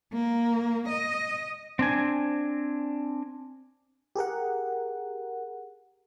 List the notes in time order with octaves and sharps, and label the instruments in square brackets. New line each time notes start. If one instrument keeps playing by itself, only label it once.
[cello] A#3
D#5
[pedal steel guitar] C4 D4 G#5
[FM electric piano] G4 G#4 A#4 F#5